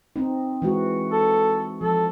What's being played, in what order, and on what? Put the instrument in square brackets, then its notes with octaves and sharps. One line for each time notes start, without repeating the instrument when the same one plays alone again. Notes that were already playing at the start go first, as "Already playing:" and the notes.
[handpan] C4 D#4
E3 G#3 F#4
[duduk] A4
[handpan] F3 [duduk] A4